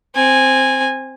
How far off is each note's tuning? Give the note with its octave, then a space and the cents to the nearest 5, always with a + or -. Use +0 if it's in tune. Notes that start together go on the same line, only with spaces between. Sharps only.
C4 +0 G#5 -10